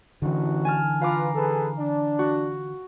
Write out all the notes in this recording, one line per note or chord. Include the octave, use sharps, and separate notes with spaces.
A1 D3 E3 F#4
G#5 A5 F6
F4 B4 F5 A#5 D6
G#4 A4 B4
D4
F#4